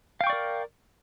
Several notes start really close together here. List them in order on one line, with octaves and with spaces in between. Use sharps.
F5 G5 C#6 D5 A#4